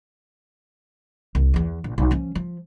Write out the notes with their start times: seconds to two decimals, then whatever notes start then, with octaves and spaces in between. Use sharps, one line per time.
1.35 C2
1.54 E2 E3
1.84 A#1
1.98 B1
2.11 F3 C#4
2.35 F3